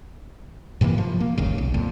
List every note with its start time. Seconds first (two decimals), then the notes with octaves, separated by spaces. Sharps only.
0.81 G#2 C3 E3 A#3
0.98 F3
1.20 A#3
1.38 G1 D#2 C#3
1.58 B1
1.74 F2 A#2